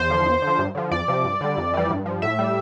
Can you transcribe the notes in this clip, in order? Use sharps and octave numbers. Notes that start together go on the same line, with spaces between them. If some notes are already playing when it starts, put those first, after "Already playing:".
Already playing: E2 C5
D3 F3
E2
D3
F3
G2
D3 F3
F2 D5
C3 F3
G2
D3 G3
F2
E3 G3
G2
F3
A2 E5
G3